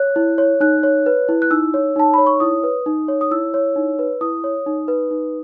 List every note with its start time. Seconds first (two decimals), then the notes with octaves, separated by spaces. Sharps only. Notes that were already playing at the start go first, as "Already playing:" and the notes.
Already playing: C#5 F#6
0.16 E4
0.38 C#5
0.60 D#4 F#6
0.83 C#5
1.06 B4
1.29 E4
1.42 F#6
1.51 D#4 E6
1.74 C#5
1.96 D#4 A5
2.14 C#5 B5
2.26 C#6
2.40 E4 D#6
2.64 B4
2.86 D#4
3.08 C#5
3.21 D#6
3.31 E4 E6
3.54 C#5
3.76 D#4
3.99 B4
4.21 E4 D#6
4.44 C#5
4.66 D#4
4.88 B4
5.11 D#4